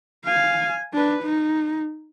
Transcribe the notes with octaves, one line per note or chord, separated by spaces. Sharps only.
F5 G#5
D4 B4
D#4